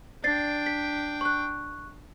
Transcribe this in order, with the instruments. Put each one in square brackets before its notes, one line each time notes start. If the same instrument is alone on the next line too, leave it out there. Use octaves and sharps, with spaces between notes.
[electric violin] D4 G5 [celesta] D5 A6 C7
[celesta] B6
C#6 F#6